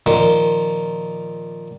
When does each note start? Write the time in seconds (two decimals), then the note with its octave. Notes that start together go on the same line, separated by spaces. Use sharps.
0.06 A#2 D#3 F3